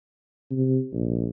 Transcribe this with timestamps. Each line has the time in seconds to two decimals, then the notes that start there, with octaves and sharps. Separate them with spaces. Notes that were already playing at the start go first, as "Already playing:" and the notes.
0.51 C3
0.93 A#1